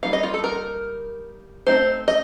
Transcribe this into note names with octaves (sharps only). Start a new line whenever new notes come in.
G3 A#3 D#4 F5
D#5
F4
A4
A#4
A3 C4 D#4 C5
D#5